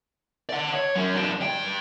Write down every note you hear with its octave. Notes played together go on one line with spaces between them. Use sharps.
D5 F#5
C#5
F#3 C#4
F#2 D4
G2 G5